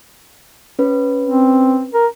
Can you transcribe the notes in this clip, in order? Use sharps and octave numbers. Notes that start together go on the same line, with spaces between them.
C#4 B4
C4
A#4